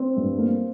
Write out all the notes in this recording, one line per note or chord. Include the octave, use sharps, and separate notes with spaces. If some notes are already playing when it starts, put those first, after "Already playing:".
Already playing: C4 C5
G2
A#3